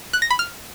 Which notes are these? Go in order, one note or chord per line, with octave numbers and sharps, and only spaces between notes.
F#6
A#6
B5
F6